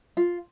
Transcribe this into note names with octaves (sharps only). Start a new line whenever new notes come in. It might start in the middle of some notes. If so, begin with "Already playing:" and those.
F4